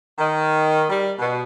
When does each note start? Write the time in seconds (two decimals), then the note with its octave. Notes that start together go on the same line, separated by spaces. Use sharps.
0.19 D#3
0.90 G3
1.19 B2